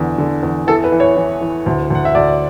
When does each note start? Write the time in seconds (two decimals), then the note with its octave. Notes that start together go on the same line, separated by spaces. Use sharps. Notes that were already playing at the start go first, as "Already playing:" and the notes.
Already playing: E2 D3
0.18 D3
0.43 E2
0.67 E3 A4
0.84 B4
0.92 E3
1.00 C#5
1.17 E3
1.41 E3
1.66 D2
1.90 D2 F#5
2.05 E5
2.15 D2 D5